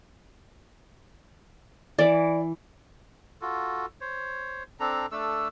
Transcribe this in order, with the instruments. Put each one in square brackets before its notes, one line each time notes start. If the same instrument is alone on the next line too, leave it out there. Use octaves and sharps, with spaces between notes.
[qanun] E3 [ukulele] D5
[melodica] F4 F#4 A4
C5 C#5
C4 D4 A4 A#5
A3 D4 A4 E6